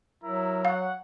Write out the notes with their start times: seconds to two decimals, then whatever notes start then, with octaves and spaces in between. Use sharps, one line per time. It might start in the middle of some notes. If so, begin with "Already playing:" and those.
0.24 F#3 E4 A#4 A#5
0.65 C#5 F5 F#5